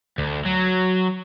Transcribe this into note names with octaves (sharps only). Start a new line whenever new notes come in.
D2
F#3